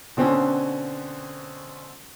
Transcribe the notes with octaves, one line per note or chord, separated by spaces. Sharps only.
B2 D3 C4 C#4